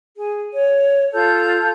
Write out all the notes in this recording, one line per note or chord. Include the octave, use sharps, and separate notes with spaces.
G#4
C#5
F4 A4 G6